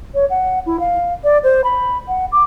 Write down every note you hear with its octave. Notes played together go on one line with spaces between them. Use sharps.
C#5
F#5
E4
F5
D5
C5
B5
F#5
D6